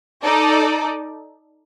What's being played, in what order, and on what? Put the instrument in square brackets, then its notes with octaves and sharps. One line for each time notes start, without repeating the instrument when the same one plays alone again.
[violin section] D#4 A4 D5